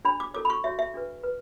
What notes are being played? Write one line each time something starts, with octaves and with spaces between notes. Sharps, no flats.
D4 G#4 C#5 B5
D6
E4 A4 C#5 D6
B5
C#6
F#4 C#5 E5
E5
D4 G#4 B4
B4